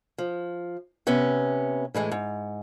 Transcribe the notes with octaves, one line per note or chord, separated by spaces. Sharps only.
F3
C3 B3 C#4
A2 E3 G#3
G#2